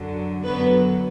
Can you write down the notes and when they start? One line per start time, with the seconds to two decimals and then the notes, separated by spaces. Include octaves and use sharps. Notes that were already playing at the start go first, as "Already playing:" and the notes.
Already playing: F#2 D3 F#3
0.43 F#2 D3 F#3 B3 B4